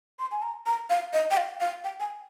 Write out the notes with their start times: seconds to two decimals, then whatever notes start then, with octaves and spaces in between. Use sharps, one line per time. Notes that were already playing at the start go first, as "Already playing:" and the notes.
0.19 C6
0.31 G#5
0.42 A#5
0.66 A#5
0.90 F5
1.13 D#5
1.31 G5
1.37 F5
1.60 F5
1.84 G5
2.00 G#5